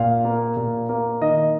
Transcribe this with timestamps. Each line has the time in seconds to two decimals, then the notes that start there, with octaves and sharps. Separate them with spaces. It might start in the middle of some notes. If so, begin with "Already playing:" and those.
Already playing: A#2 F5
0.25 A#3
0.57 A#2
0.89 A#3
1.21 D#3 D#5